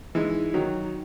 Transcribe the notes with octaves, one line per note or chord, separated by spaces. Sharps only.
E3 G#3 D#4
D#3 F#3 F#4